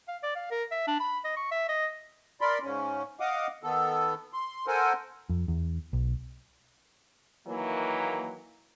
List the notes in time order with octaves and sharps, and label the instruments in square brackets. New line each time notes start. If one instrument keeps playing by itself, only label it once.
[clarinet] F5
D5
F5
A#4
E5
D4
B5
D#5
C#6
E5
D#5
[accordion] A#4 D5 B5 C6
G#2 C#3 C#4
D#5 F5 F#5 D6 D#6
D#3 B3 A4
C6
A4 A#4 C5 F#5 G#5
[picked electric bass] F2
E2
B1
[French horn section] D#3 E3 F#3 A#3